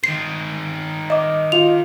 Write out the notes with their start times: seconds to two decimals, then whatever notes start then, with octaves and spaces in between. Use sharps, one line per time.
0.04 D#3 C5 C7
1.10 D#5 D6
1.52 F4 F7